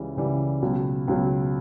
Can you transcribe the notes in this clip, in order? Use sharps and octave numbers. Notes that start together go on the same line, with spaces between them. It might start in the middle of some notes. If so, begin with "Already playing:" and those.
Already playing: C#2 C#3 E3 G3
C#2 C#3 E3 G3
C#2 B2 F#3
C#2 B2 F#3